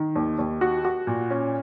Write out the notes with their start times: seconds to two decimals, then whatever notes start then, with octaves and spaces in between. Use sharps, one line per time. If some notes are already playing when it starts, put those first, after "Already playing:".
Already playing: D#3
0.16 D#2
0.39 D#2
0.61 F#4
0.85 F#4
1.07 A#2
1.30 C#4